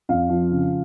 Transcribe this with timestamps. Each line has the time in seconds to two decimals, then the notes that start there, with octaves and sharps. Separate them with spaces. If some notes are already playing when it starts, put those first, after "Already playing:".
0.09 F2 F5
0.30 F3
0.51 C#3